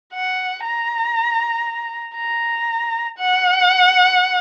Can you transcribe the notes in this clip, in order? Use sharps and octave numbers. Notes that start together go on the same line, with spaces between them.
F#5
A#5
A#5
F#5